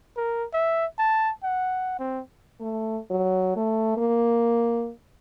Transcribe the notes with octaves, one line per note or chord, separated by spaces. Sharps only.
A#4
E5
A5
F#5
C4
A3
F#3
A3
A#3